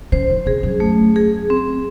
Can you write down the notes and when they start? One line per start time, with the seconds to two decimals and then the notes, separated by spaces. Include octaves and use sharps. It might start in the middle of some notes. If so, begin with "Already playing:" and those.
0.12 C#3 C5
0.30 D#3
0.46 C3 G#4
0.63 F#2
0.80 A3
1.16 G#4
1.50 C4